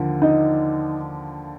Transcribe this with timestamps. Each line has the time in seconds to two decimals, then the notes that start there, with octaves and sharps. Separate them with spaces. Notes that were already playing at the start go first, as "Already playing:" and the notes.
Already playing: D#2 D3 F3
0.22 D#4 D#5